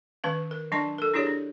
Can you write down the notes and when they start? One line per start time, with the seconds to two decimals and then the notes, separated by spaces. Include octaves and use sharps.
0.24 D#3 C#4 B4 F5
0.51 A#4
0.72 F#3 D4 D5 D#5 A5 C6
0.98 A4 A#4
1.13 D4 E4 G4 G#4 C#5 D5
1.27 D4